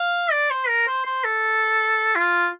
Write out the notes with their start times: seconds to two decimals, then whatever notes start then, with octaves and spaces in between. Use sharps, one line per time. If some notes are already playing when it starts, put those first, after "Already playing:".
Already playing: F5
0.31 D5
0.50 C5
0.68 A#4
0.87 C5
1.06 C5
1.24 A4
2.15 F4